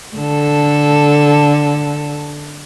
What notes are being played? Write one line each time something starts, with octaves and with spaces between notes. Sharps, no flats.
D3 A4